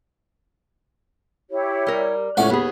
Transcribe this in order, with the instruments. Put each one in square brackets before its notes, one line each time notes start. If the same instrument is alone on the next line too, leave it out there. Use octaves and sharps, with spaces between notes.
[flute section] E4 G4 C#5
[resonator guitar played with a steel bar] G3 A#4
[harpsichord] C#2 A2 D5 [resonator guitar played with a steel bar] C#4 F#5 [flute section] C#5 E5 C#6
[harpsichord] D#2 [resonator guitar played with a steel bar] B3 G#4 [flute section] B5